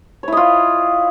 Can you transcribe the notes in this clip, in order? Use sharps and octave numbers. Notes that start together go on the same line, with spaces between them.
E4 F4 C#5 D#5